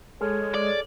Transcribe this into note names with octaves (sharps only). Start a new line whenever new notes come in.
G#3 G#4 A4 C#5 F6
D5